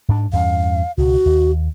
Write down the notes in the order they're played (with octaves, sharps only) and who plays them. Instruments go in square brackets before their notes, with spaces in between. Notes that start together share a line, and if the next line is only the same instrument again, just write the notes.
[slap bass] G#2 D4
[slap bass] E2 G2 C#4 [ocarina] F5
[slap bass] C#2 B2 [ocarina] F#4
[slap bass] D#2